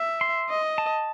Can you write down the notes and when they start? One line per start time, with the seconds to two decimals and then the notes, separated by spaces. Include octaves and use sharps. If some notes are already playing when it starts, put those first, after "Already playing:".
Already playing: E5
0.21 C6
0.50 D#5
0.78 A5